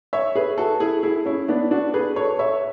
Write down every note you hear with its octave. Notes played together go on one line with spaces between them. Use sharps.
C#5 E5
G#4 B4
F#4 A4
E4 G#4
E4 G#4
C#4 E4
B3 D4
D4 F#4
G#4 B4
A4 C#5
C#5 E5